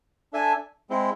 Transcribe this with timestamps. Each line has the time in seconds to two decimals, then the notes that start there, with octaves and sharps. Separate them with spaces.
0.33 D4 A4 E5 G#5
0.90 G#3 C4 E4